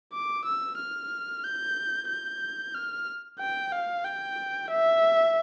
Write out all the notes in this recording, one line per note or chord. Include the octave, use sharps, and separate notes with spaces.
D6
E6
F6
G6
G6
F6
G5
F5
G5
E5